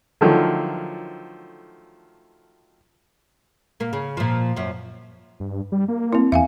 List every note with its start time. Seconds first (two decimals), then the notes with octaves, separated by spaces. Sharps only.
0.21 D3 D#3 F3 F#3 A3
3.80 A#2 A#3
3.93 C#3
4.17 A#2 F3
4.57 F#2 F3
5.40 G2
5.72 G3
5.88 A#3
6.13 C4 E4
6.32 E2 E5 F5 G#5